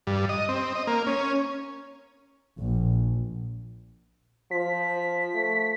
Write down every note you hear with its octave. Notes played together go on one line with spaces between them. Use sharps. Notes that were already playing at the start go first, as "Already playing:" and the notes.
G2
D#5
C4
D#5
A#3
C#4
A#1
F3 B6
A3